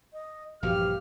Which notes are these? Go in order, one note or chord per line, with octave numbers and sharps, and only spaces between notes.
D#5
A#1 G2 E3 F3 F#4 G4 F5 F6